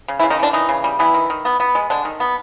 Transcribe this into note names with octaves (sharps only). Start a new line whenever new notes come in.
C#3
E3 E4
C#3
D#3 D#4
D3 E3 D4
D#3 E3 D#4
C#3
G3
E3 B3 E4
D#3
D#3
B3
B3
G#3
D3 G#3 D4
D#3
B3